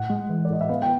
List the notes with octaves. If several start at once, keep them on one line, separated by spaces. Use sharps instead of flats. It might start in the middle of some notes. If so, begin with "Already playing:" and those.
Already playing: A2 F#5
G#3
E3
D5
A2 D#5
E5
B3 F5
G5